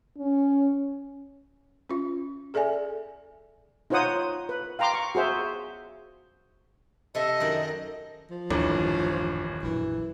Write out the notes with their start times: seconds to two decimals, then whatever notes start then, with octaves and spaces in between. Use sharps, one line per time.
0.18 C#4
1.89 C#4 F4
2.54 G#4 A4 D5 E5 G#5
3.90 D#4 F4 C5 C#5 F#5 D#6
4.49 B4
4.79 F5 G5 A#5 C6 D6
4.94 C#6
5.15 F#4 G#4 C5 E5
7.15 C3 A4 D#5 E5
7.40 F#2 D#3 D5
8.30 F3
8.50 D#1 A1 F#2 D4
9.63 A#1 F#2 E3